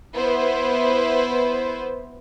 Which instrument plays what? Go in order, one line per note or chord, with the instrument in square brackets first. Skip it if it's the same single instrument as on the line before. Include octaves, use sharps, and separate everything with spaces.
[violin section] B3 E4 B4 C5